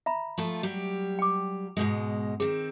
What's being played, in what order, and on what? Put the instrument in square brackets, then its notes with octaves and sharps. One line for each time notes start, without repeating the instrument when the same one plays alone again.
[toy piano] E5 A#5 B5
[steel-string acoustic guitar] F3 A3 F4
F#3 G3 G4
[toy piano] G5 D6
[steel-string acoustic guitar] G#2 B2 G#3
[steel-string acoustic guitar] D#3 C4 [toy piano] G#4